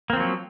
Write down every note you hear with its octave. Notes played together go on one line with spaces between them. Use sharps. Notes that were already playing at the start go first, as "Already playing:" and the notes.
F3 F#3 A#3 C4